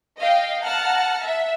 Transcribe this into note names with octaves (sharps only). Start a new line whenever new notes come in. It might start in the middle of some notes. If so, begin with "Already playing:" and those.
D#5 F5 G5
F#5 A5 A#5 F6
E5